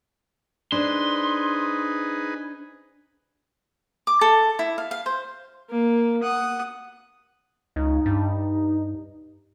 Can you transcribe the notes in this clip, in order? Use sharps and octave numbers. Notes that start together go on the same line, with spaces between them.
D4 D#4 G#4 B4 C5 C6
D6
A4
E4
F5
F5
C5
A#3
F#5 D#6
C#2 D#4
G2